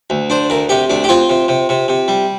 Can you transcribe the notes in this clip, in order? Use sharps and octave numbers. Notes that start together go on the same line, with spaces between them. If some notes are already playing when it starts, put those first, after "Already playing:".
D2
D4 C5
D2 A#4
C3 G4
D2 D4
G4
C4 F4
C3
C3
C3
C3
G3